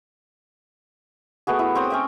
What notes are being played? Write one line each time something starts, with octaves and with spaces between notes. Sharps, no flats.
A3 B3 F#4 G#4
E4
C4 C#5 G5 D#6
C#4 E5 G5